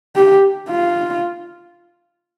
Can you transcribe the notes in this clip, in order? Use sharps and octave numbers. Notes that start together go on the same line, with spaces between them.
G4
F4